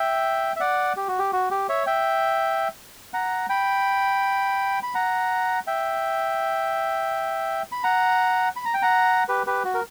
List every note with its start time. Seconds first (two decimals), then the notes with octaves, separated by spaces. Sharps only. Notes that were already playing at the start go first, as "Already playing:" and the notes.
Already playing: E5 G5
0.56 E5
0.60 D5 F#5
0.97 G4
1.08 F#4
1.19 G4
1.33 F#4
1.51 G4
1.69 C#5 E5
1.87 E5 G5
3.13 F#5 A#5
3.49 G5 B5
4.83 B5
4.94 F#5 A#5
5.67 E5 G5
7.72 B5
7.83 F#5 A#5
8.56 B5
8.65 A#5
8.74 G5
8.82 F#5 A#5
9.29 G4 B4
9.47 G4 B4
9.64 F#4
9.74 A#4